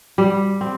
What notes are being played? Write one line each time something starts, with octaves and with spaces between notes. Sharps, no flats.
G3
C4